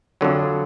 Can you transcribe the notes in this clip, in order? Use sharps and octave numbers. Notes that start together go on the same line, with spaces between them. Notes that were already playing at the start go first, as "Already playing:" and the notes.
F2 D3 F#3